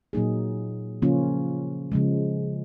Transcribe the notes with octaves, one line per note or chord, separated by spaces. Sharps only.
A#2 F#3 A#3 D#4 G#4
C#3 F3 A#3 C#4 F4
C#3 F3 G#3